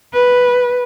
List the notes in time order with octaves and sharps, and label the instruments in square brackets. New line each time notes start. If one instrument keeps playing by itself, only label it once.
[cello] B4